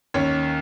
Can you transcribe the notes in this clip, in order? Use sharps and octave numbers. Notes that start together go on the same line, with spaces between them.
D#2 C#4 C#5